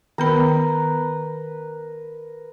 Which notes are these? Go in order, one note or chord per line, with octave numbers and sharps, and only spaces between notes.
D#3 B3 A#4 B4 B5